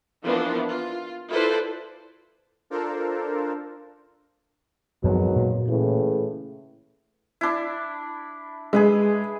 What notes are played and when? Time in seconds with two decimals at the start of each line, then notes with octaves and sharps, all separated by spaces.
0.25 E3 F3 A#3 B3 D4
0.70 F4
1.30 E4 F4 A4 B4 C5 D5
2.70 D4 F4 A4 A#4 C5
5.04 G#1 F#2 B2 F3 F#3
5.36 A#2 A#3
5.68 A2 C#3 E3
7.41 D4 E4
8.73 G#3 G#4 B4 E5